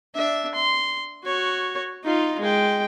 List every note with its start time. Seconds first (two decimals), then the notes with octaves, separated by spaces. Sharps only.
0.15 D4 E5
0.55 C6
1.24 F#4 C#5
2.04 D#4 F4
2.40 G#3 G5